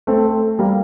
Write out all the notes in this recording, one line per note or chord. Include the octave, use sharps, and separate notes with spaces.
A3 C4
G3 A#3